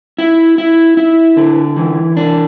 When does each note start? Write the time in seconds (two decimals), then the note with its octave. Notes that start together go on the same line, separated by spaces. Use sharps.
0.18 E4
0.58 E4
0.97 E4
1.37 D3
1.76 E3
2.17 D4